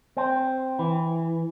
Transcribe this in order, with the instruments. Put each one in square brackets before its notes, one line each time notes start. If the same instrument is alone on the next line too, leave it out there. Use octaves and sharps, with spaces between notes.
[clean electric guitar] C4
E3